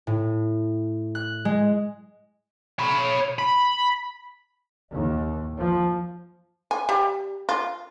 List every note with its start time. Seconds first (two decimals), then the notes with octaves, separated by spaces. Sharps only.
0.07 A2
1.15 F#6
1.45 G#3
2.79 C#5 B5
3.39 B5
4.91 D#2
5.57 F3
6.71 G#5
6.89 G3
7.49 F4